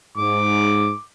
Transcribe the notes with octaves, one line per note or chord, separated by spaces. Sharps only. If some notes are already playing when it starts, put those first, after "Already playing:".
G#2 D6